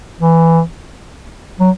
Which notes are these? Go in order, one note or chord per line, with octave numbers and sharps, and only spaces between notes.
E3
F#3